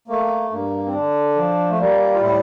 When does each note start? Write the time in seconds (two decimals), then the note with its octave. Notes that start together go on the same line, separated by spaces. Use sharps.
0.08 A3 A#3
0.51 G2 A#3
0.86 C4
0.93 D3 D4
1.36 F3
1.70 A3
1.78 G3 A#3
2.14 F4
2.20 A2 E4